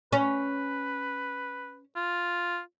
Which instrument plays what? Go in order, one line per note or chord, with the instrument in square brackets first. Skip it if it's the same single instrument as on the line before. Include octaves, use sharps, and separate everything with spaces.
[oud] C#4 [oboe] B4
[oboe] F4